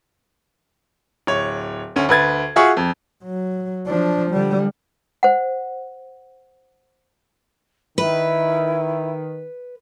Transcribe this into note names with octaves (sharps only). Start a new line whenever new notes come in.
D1 C#5
D2 C#4
D2 B4 G#6 A6
F4 F#4 G#4 E5 F#5 C#6
F2
F#3
F3 D4
D3 G3
C5 F#5
D#3 E4 B4